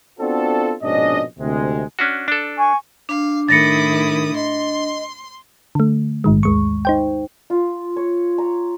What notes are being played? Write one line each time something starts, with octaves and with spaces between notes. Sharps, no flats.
B3 C4 D4 F4 F#4 A4
A#1 G#2 B2 C#4 D4 D#5
D2 C3 G#3
C#4 D4 F#4
D4 A4
G#5 C#6
D4 F5
A2 D#3 E4 D#6 A6 A#6 C#7
D#5 C6
D3 A3
A#1 G#2 D#3 G#3
D#2 G#3 C#6
D#4 C5 G5
F4
C#5
A#5